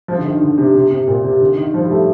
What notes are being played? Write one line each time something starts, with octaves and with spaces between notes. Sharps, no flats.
F3
D3
D#3
D3
C3
C3
C3
A#2
C3
D3
D#3
F3
G3
A3